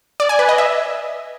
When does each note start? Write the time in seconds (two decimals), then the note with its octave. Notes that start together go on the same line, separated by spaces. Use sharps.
0.20 D5
0.29 G#5
0.39 B4
0.49 D#5
0.58 E5